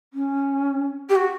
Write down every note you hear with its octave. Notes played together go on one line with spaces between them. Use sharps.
C#4
G4
F#4